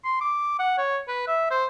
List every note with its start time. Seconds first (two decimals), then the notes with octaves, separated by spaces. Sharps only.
0.05 C6
0.21 D6
0.59 F#5
0.78 C#5
1.08 B4
1.28 E5
1.51 C5